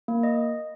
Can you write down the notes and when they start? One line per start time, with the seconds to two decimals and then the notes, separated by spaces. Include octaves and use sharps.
0.08 A#3
0.23 D#5